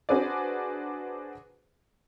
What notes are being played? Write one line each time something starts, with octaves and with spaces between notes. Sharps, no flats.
D4 F#4 G#4 B4 C5 D5